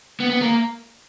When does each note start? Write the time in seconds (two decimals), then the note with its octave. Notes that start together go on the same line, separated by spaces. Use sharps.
0.20 B3
0.30 B3
0.42 A#3